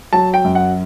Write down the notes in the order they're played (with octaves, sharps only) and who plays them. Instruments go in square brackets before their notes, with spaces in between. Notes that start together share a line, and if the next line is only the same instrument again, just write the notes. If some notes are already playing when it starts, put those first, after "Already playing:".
[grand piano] F#3 A5
G5
F#2
F#5